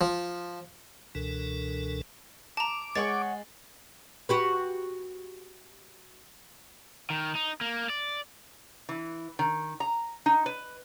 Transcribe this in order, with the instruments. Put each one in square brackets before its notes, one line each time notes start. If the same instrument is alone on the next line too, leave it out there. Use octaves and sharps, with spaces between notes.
[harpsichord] F3
[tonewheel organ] C#2 B2 E3 D4 A4 A#4
[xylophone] A5 A#5 [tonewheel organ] D6
[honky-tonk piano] G#3 [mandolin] C#5 F#5 C#6 [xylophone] A6
[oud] F#4 G4 B4
[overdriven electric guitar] D#3
D#4
A#3
D5
[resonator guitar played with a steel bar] E3
D#3
A#5
D#4
B4